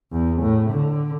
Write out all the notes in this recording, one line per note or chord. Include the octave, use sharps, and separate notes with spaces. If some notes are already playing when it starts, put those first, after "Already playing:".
E2
A2
D3